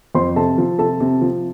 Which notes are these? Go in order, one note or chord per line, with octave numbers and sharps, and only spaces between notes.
F2 C5 C6
C3 A4 A5
F3
C3 A4 A5
C3
F3